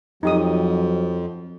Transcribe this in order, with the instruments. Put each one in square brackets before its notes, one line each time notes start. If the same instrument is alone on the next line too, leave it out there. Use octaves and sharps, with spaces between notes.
[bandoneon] F2 [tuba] F3 [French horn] F#3 [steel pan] D#4 G4 D#6